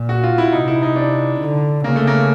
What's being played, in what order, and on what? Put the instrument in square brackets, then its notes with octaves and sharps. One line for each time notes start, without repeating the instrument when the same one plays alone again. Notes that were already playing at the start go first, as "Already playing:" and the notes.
Already playing: [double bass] A#2
[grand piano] F#4
F4
E4
[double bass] C3 [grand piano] D#4
[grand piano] E4
D#4
D4
[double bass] D3
[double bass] C#3 [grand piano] A#3
[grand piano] A3
A#3